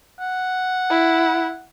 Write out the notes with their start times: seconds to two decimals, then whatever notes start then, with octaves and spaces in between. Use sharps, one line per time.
0.20 F#5
0.90 E4